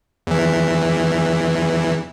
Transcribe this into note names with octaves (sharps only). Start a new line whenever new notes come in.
E2 E3